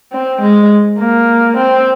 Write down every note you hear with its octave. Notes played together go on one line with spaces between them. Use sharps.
C4
G#3
A#3
C4